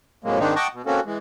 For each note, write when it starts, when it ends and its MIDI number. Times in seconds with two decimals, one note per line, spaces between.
0.24 0.39 45
0.24 0.39 48
0.24 0.39 54
0.24 0.39 56
0.24 0.39 58
0.39 0.54 44
0.39 0.54 51
0.39 0.54 56
0.39 0.54 60
0.39 0.54 62
0.39 0.54 63
0.56 0.68 75
0.56 0.68 78
0.56 0.68 79
0.56 0.68 81
0.56 0.68 85
0.56 0.68 86
0.74 0.82 47
0.86 1.00 58
0.86 1.00 60
0.86 1.00 61
0.86 1.00 66
0.86 1.00 69
1.06 1.18 52
1.06 1.18 56